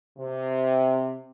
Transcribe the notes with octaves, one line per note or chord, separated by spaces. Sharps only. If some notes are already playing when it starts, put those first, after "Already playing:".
C3